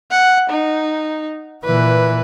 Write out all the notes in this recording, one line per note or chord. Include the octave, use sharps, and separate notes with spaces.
F#5
D#4
A#2 E3 B4